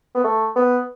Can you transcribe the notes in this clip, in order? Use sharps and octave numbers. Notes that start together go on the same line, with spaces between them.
B3
A3
B3